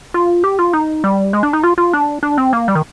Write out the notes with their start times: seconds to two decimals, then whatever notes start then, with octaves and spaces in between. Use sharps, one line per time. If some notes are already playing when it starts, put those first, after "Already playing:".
0.14 F4
0.44 G4
0.59 F4
0.73 D#4
1.04 G3
1.33 G#3
1.43 D4
1.53 D#4
1.64 F4
1.78 F4
1.93 D4
2.23 D4
2.38 C4
2.53 A#3
2.68 G3
2.75 D#3